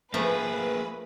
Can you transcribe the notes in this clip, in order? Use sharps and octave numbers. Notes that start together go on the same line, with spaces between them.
F3 A3 A#3 G#4 B4